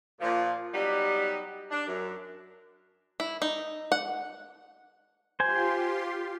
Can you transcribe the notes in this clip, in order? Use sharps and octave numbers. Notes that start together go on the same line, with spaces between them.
A#2 F3
F#3 G3 B3 D#4 G4
D4
F#2
E4
D#4
F#5
F4 G4 C5 G#5 C6